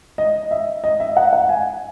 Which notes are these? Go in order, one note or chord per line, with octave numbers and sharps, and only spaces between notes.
D#5
E5
D#5
E5
F#5
F#5
G#5